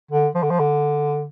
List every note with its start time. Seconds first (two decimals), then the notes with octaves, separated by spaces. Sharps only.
0.11 D3
0.35 F3
0.42 D3
0.50 F3
0.59 D3